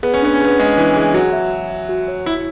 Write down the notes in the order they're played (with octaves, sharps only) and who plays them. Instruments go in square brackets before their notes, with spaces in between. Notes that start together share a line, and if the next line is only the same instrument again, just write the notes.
[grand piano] B3 [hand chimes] G#4
[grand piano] C#4
[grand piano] B3 [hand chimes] D4
[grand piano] C#4
[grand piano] B3 [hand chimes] G#4
[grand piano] G#3 [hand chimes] D4
[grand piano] E3 [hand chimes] D4
[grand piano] E3 [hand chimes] G#4
[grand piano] F#3 [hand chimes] F#4
[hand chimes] E5
E5
E5
F#4
C#5
[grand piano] E4 [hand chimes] C#5